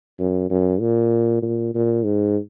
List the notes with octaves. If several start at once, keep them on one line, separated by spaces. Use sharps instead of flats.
F#2
F#2
A#2
A#2
A#2
G#2